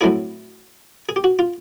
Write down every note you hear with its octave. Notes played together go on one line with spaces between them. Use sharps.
A2 F#3 A3 C4 E4 G#4
G#4
G4
F#4
F4